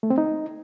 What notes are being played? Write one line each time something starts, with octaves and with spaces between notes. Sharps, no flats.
A3
C4
D#4